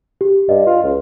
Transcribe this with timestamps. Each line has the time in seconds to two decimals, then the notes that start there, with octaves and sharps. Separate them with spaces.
0.21 G4
0.49 G2 D#5
0.67 F4
0.83 C#2